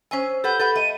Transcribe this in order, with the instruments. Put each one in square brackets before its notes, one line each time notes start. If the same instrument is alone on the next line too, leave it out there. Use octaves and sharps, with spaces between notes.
[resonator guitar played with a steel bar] C#4 G#5 [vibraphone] C5 E6
[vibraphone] G4 [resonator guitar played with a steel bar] A4 B4 F#5 [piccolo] G6
[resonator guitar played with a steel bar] A4 B4 F#5
[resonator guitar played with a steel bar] A3 [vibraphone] D#5 [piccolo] D#7